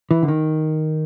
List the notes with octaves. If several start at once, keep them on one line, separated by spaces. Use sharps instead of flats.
E3
D3
D#3